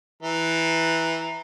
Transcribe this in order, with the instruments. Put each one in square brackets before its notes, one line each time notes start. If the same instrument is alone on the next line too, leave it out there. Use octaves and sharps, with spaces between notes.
[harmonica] E3 A#5